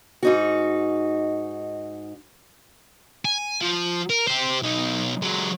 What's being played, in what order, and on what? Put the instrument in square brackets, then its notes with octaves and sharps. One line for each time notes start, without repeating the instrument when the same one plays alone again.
[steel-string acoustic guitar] G#2 D#4 F#4
[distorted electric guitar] G#5
F3
A#4
G4 C5
B1 D#4
F#3 G#3